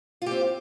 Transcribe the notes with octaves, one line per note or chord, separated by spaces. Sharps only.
C4 F4 G4